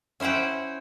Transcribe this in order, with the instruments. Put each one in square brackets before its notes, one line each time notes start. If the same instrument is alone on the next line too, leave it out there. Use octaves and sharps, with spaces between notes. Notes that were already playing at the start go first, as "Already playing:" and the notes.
[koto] C#4 E4 C5 F#5 G5